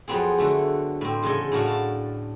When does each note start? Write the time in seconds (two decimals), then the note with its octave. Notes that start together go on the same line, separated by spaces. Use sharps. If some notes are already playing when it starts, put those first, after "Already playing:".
0.08 F2 F#3 B3 C4 G#4
0.38 D3 A3 F#4
1.01 A2 C4
1.22 E2 C#3 A4 D#5 G#5
1.52 A2 D4 F#4 F5
1.66 F5 A5